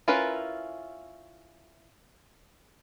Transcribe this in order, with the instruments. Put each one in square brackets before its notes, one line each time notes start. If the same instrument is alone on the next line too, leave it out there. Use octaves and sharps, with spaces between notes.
[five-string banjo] C#4 E4 F4 A#4 B4